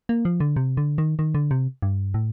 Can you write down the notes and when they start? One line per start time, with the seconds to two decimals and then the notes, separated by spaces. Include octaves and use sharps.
0.09 A#3
0.25 F3
0.40 D3
0.56 C3
0.77 D3
0.98 D#3
1.19 D#3
1.35 D3
1.51 C3
1.82 G2
2.14 A2